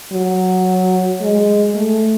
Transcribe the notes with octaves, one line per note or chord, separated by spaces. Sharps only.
F#3
G#3
A3